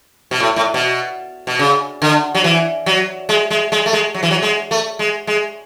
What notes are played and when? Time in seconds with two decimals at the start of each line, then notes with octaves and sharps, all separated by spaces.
0.31 B2
0.40 A2
0.56 A2
0.74 B2
1.47 B2
1.59 C#3
2.02 D3
2.35 F#3
2.44 E3
2.86 F#3
3.29 G#3
3.50 G#3
3.72 G#3
3.86 A3
3.93 G#3
4.14 F#3
4.23 E3
4.31 F#3
4.42 G#3
4.71 A3
4.99 G#3
5.27 G#3